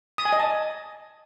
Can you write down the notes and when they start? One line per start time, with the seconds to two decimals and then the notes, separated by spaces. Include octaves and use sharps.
0.18 D#6
0.25 G#5
0.33 D#5
0.40 A5